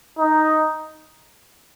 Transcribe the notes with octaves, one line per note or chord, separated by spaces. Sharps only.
D#4